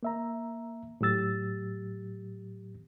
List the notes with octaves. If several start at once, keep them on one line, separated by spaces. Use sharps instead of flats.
A#3 E5 A#5
A2 F#3 G4 E6 A6